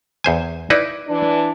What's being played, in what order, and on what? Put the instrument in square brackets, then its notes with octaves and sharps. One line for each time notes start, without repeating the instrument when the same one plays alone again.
[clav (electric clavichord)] E2 C5 G#5
[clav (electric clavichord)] D#4 E4 B4 [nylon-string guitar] D5
[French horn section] E3 D4